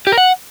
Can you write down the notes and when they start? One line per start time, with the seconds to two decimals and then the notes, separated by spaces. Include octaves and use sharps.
0.07 G4
0.12 A#4
0.17 F#5